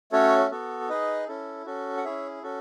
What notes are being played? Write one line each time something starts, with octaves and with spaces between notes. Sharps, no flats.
A3 C#4 F#4 A4 C#5
B3 F#4 A4
D#4 G#4 B4 D#5
C#4 E4 A4
C#4 F#4 A4
F#5
C#4 E4 G#4 C#5 E5
C#4 F#4 A4